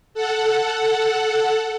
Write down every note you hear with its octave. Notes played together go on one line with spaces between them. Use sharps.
A4 F#5